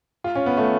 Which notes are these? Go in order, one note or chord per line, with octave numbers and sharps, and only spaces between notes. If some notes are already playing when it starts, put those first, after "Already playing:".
F4
C#4
B3
A3